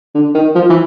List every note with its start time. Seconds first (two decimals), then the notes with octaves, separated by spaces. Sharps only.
0.15 D3
0.35 D#3
0.55 F3
0.70 E3